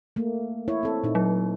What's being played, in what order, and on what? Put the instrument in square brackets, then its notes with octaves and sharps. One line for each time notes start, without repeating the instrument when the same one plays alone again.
[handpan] A3 A#3
E4 C#5
C4 A4
A#2 D#4
[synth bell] F#3